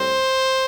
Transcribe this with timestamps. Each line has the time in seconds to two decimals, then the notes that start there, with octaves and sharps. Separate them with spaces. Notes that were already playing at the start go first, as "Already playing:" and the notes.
Already playing: A2 G3 C4 C5